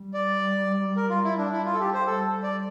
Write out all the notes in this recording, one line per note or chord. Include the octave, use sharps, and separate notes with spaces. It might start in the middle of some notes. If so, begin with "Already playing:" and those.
Already playing: G3
D5
A#4
F4
E4
D4
E4
F4
A4
G4
C5
G3 A4
D5